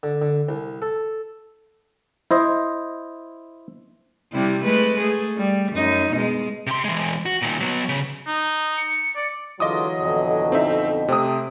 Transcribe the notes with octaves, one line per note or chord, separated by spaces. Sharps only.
D3
D3
C2
A4
E4 C5 D#5
C3 G3 E4
G#3 A3 B4
A3 G#4
G3
F#2 D#4
B2 G#3
C3 C6
E3 G#3
F#4
A#2 D#3
F#3 B3
C#3
D#4
C#7
D5
D3 E3 F#3 G#3 F4 D#5 D6 D#6
F2 B2 D3
C4 D#4 E5
C3 A3 C4 D#6